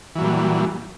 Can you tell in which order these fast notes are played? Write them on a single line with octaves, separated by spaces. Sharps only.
E3 F#3 A#2 G3